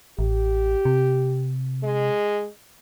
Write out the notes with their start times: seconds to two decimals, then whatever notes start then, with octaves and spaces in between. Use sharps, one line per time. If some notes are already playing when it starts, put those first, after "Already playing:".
0.19 A1 G4
0.85 C3
1.83 G#3